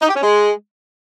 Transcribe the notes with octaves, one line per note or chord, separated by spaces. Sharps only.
D#4
G4
C#4
G#3